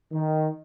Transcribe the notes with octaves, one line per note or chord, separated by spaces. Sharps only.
D#3